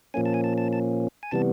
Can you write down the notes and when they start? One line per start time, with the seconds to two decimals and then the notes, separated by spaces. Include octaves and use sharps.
0.14 A#2 F3 A#3 C#4 G#5
0.26 A5
0.34 G#5
0.44 A5
0.58 A5
0.73 A5
1.23 G#5
1.31 C3 E3 G3 B3 A5